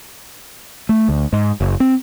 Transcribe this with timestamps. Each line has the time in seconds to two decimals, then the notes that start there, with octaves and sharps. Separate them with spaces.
0.89 A3
1.08 D2
1.33 G#2
1.60 F#1
1.80 C4